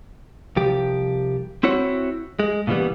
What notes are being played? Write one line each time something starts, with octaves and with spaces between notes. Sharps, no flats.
C2 F3 G4
C4 E4 F#4 C#5
G#3
A#2 C#3 E3 G3 B3